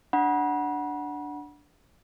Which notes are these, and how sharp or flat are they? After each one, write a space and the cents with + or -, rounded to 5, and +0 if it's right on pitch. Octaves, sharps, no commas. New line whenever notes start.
D4 +0 F#5 +0 B5 -35